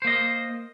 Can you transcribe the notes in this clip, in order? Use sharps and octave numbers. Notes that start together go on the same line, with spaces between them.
A#3 C5 D#5